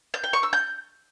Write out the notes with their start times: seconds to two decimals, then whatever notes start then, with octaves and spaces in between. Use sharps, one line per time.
0.14 G6
0.24 G5
0.33 C#6
0.43 E6
0.53 G6